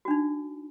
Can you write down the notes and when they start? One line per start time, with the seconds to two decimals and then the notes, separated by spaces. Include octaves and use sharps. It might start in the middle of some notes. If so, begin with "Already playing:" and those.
0.05 F#4
0.08 D4
0.11 D#4